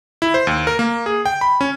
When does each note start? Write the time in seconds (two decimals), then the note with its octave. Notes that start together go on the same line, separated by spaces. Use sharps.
0.22 E4
0.34 C5
0.47 D#2
0.67 A#4
0.79 A#3
1.06 G#4
1.26 G5
1.41 B5
1.61 C#4